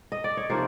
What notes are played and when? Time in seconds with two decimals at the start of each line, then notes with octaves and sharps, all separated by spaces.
0.12 D#5
0.24 D5
0.37 C#5
0.50 C3 F3 A#3 D#4 C5